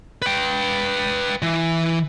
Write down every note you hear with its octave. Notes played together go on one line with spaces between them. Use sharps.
B4 G5
E3